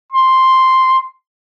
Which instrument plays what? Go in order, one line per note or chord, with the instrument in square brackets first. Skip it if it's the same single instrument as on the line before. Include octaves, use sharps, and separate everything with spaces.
[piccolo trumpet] C6